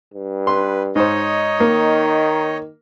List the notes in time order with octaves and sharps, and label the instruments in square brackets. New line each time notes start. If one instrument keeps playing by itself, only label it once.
[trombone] G2
[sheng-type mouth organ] B4 [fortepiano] C6
[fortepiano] G#2 C5 [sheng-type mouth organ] D#4 C#5 D#5
[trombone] D#3 [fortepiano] A#3